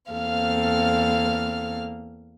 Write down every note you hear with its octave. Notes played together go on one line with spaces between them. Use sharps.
E2 A#3 C4 A4 F5 F6